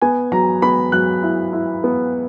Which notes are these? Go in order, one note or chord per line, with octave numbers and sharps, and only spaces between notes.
B3 G#5
F#3 A#5
B3 B5
F#3 F#6
E4
E4
B3